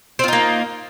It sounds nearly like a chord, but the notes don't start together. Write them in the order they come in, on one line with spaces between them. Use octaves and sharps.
C4 F4 D#4 A#3